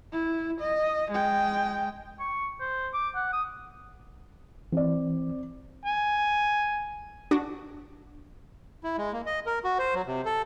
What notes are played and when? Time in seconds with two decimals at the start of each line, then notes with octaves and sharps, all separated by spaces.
0.12 E4
0.60 D#5
1.11 G#3 G5
2.20 C#6
2.60 C5
2.94 D6
3.15 F#5
3.33 D#6
4.73 E3 C4 D5
5.85 G#5
7.31 D4 F#4 D6 A#6
8.84 E4
8.98 G#3
9.13 A#3
9.26 D#5
9.46 A#4
9.64 F#4
9.79 C5
9.94 F#3
10.07 C3
10.25 A4